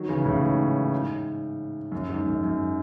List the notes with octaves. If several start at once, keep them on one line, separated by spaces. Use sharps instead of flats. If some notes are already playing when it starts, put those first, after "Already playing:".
Already playing: D#3 F#3
C#3 E3
A2 C#3
G#2
F#2
G#2
F#2
F#2